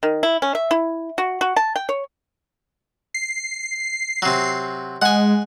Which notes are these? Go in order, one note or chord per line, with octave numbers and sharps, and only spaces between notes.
D#3
E4
C#4
E5
E4
F#4
F#4
A5
G5
C#5
C7
C3 F#3
G#3 F#5 G#5